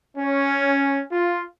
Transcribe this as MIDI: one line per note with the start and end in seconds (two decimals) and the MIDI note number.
0.17 1.02 61
1.11 1.43 65